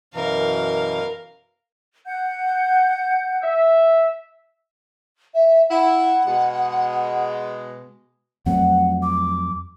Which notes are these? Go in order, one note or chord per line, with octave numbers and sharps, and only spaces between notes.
F#2 B2 E3 A#4 F5
F#5 G6
E5
E5
E4 F#5
B2 G#3
F2 F#3 A3 F#5
D6